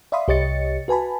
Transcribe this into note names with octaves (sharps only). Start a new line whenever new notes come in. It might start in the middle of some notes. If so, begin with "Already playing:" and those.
D5 E5 F5 B5 C6 D#6
C2 G4 C#5 D#5 A6 C#7
F#4 B4 G#5 A5 B5